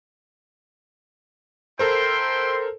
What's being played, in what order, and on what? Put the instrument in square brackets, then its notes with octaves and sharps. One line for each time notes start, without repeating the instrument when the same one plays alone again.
[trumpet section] E4 G5 C6 [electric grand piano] A4 A#4 C5